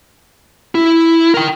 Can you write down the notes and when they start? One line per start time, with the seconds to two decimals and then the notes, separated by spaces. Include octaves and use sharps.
0.75 E4
1.34 A#4 G5